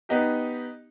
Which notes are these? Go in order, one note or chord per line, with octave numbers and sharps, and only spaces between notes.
B3 D#4 G4